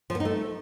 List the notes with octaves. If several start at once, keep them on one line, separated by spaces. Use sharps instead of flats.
F3
B3
D#4
A3